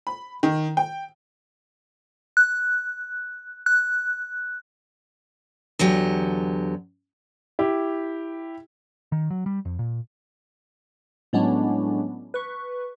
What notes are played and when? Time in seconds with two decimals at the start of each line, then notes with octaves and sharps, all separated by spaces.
0.07 B5
0.43 D#3
0.77 G5
2.37 F#6
3.66 F#6
5.79 E2 D3 F#3 G4
7.59 E4 G4
9.12 D#3
9.30 F#3
9.46 G3
9.65 F2
9.79 A#2
11.33 A2 F#3 G#3 B3 C#4 D4
12.34 B4 C#6